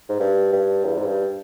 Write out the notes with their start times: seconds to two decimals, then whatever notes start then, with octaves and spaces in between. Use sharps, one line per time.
0.09 G#2
0.20 G2
0.52 G2
0.84 E2
0.98 G#2
1.06 G2